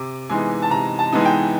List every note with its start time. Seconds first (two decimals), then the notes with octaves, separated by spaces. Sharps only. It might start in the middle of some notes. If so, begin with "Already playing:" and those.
Already playing: C3 D6
0.29 E3 G#3 B3 D#4 G#5
0.62 A5
0.70 C3 A#5
0.99 A5
1.12 E3 G#3 B3 D#4
1.21 G#5
1.25 G5